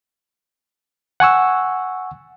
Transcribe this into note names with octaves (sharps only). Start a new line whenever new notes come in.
F#5 G#5 C#6 E6